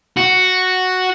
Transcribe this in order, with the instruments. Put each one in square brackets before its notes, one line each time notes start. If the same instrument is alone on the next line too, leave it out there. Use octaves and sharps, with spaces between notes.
[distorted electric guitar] F#4